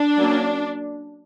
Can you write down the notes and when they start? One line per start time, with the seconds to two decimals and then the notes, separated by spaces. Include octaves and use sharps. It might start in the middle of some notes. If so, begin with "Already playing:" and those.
Already playing: D4
0.18 F#3 A#3 C#4